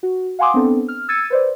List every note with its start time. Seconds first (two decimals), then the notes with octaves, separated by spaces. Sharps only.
0.03 F#4
0.39 F5 F#5 G#5 C6 D6 D#6
0.54 B3 C4 D4 A4
0.88 F6
1.08 E6 G#6 A6 C#7 D#7
1.30 B4 C5 D5